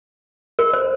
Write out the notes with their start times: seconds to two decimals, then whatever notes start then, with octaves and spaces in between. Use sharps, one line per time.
0.59 A#4
0.73 C5